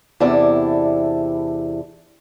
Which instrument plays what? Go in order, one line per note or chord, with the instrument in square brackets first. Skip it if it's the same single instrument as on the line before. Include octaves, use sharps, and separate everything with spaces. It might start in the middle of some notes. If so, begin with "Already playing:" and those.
[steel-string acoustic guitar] E2 C3 D4 E4 A4 D5